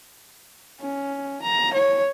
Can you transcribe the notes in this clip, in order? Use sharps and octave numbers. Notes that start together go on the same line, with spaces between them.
C#4
A#5
C#5